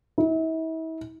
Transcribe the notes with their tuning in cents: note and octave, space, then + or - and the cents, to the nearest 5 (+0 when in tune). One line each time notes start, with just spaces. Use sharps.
E4 -40